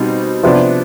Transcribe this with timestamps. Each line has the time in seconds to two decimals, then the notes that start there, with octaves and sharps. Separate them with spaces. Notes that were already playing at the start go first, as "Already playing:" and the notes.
Already playing: B2 G3 C4 D#4
0.43 C3 F3 B3 D4